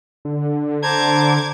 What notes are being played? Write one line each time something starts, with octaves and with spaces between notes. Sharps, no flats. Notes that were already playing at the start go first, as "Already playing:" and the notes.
D3
C5 A5 A#5 D6 G#6